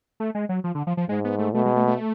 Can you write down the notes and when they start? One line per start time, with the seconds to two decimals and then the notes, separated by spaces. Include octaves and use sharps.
0.20 A3
0.35 G#3
0.49 F#3
0.64 F3
0.75 D3
0.87 F3
0.97 F3
1.09 G#2 G#3
1.25 B3
1.38 A3
1.54 B2 A3
1.65 G#3
1.76 A3
1.87 A3